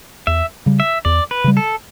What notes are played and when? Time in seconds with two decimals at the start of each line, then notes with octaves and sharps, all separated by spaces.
0.27 E2 E5
0.66 C#3 G3
0.80 E5
1.05 E2 D5
1.31 B4
1.44 C#3 G3
1.57 A4